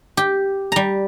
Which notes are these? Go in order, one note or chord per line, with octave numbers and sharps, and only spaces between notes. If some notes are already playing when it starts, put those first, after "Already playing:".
G4
G3 A#5